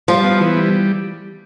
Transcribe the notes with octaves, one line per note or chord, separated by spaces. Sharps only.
F3 G3 F4
B3
E3
G3